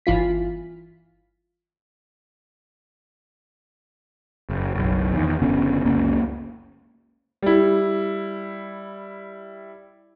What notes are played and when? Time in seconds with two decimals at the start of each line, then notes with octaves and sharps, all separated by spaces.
0.06 G1 E3 F4 B6
4.50 F#1
4.75 F#1 B1
5.13 E2 D#3
5.42 F#1 D3 B3 C#4
5.85 F#1 C#2 A#3 C#4
7.42 G3 E4